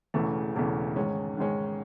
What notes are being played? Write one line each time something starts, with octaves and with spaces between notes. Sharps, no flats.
E1 E2 C#3 E3 A3
E1 E2 C#3 E3 A3
G#2 D#3 G#3 C#4
G#2 D#3 G#3 C#4